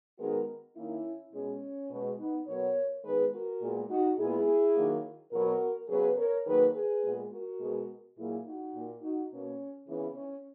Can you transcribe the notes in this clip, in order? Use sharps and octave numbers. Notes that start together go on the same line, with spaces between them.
D#3 G#3 B3 F#4 A#4
D#3 A#3 C#4 E4
B2 G#3 B3 C#4
B2 G#3 B3
B3 D#4
B2 F#3 B3 A#4 C#5
D#3 G#3 B3 G#4 B4
F#4 A#4
A#2 G#3 B3
D#4 F#4
A#2 G#3 B3 E4 G#4
D#3 F#3 A#3
B2 F#3 B3 F#4 A#4
C#3 F#3 B3 G#4 B4
A#4 C#5
D#3 F#3 A#3 G#4 B4
G#4 B4
A#2 G#3 B3
F#4 A#4
B2 G#3 B3
A#2 F#3 A#3 E4 G#4
D#4 F#4
A#2 A#3
D#4 F#4
B2 A#3 C#4
C#3 E3 B3 C#4 E4
C#4